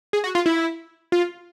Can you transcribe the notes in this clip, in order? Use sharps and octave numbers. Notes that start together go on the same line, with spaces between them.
G#4
F#4
F4
E4
F4